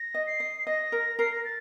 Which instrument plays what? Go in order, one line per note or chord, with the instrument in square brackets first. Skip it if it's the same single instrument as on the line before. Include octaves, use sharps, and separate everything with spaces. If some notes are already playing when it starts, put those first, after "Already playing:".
Already playing: [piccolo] A#6
[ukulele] D#5
[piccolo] C7
[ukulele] D#5
[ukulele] D#5 [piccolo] A#6
[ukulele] A#4
[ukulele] A#4 [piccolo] C7
[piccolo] A#6
A6